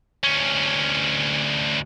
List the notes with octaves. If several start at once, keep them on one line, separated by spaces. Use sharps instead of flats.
D2 C#4